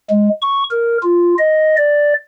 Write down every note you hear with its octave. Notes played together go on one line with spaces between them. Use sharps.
G#3
C#6
A#4
F4
D#5
D5